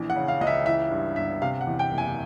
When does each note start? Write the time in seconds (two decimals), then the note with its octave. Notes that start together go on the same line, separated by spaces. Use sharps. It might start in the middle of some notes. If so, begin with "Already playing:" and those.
Already playing: A#1 E3
0.10 F#5
0.16 C#3
0.28 F5
0.41 C#2 D#5
0.47 E5
0.66 E3 E5
0.91 G2
1.16 G1 E5
1.42 C3 F5
1.61 F#5
1.67 E2
1.79 G5
1.92 F#1
1.98 G#5